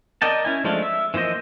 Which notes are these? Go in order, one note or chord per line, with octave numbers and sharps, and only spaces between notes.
A#4 D5 D#5 G5 A5
C#4 E4 G#5
F3 G#3 A3 D4 F4
E5
E3 F3 A#3 C5 D#5